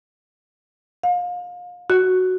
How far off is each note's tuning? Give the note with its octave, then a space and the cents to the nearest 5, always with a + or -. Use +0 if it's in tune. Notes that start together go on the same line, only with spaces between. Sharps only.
F5 +30
F#4 +0